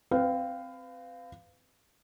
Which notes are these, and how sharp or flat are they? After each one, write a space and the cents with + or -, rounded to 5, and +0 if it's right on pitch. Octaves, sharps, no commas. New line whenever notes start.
C4 +0 B4 +30 F5 +0